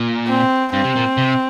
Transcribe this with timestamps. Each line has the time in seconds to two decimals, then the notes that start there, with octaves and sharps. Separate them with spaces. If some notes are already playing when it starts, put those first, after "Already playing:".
Already playing: A#2
0.27 C4
0.73 G2 C4
0.84 C3
0.96 A#2
1.17 C3